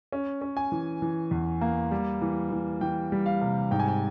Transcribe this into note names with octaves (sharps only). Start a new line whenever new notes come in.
C#4
C#4
G#5
E3
E3
E2
A#3
G3
E3
E3
E3 G5
G3
F5
C3
G#2 G5
G#5
G5